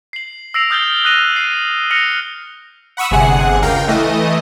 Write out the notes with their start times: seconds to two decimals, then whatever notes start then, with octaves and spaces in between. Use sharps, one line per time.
0.13 C7 F#7
0.54 E6 A#6 C7 D7 F7
0.70 D#6 F6 G6 A6 C7 G7
1.04 D#6 F#6 A#6 D#7 F7
1.36 C7
1.91 F6 A#6 C#7 F7 F#7
2.97 F#5 B5 C#6 D#6 E6
3.11 G1 C3 G#4 F#5
3.62 C#2 A#4 F5 G5
3.88 E3 A3 D#5